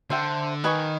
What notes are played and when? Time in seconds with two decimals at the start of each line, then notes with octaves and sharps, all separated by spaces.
0.10 D3 C5 E5 G5
0.64 D#3 B4 D#5 G#5 C#6